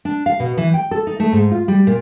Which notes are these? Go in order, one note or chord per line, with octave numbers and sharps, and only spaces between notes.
D4
F5
B2
E3
G5
A4
D#4
A3
G#2
F4
G3
A#2